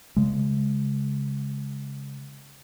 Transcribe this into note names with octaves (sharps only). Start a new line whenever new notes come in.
C#3 G#3